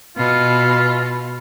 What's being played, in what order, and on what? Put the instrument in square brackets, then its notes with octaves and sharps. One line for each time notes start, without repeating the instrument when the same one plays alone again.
[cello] B2 [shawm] F4